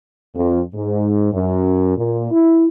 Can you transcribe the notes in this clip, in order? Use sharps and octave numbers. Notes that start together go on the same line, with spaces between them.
F2
G#2
F#2
A#2
E4